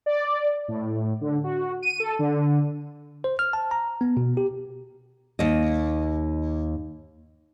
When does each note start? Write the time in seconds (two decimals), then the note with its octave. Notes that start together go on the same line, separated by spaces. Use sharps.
0.06 D5
0.68 A2
1.21 D3
1.44 F#4
1.83 D#7
2.00 A4
2.19 D3
3.24 C5
3.39 F6
3.53 A5
3.71 A#5
4.01 B3
4.17 B2
4.37 G4
5.39 D#2 D#5